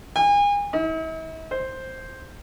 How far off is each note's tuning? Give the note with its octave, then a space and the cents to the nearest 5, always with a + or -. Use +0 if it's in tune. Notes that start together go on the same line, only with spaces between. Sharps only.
G#5 -35
E4 -45
C5 +5